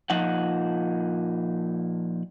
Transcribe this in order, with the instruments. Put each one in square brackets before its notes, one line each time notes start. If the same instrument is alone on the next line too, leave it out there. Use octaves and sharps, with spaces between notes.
[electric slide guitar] A#2 F3 D#4 F#5